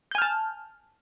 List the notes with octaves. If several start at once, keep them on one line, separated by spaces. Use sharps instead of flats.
G#5 A5 F6 G6